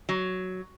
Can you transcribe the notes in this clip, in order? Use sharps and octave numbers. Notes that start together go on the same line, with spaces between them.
F#3